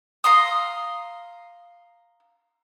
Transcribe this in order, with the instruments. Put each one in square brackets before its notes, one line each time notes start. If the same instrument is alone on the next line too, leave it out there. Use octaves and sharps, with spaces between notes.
[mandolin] F5 A#5 C6 D#6